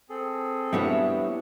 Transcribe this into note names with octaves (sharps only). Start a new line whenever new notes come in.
C4 G#4 A4
G3 B3 D4 E4 F#4 C#5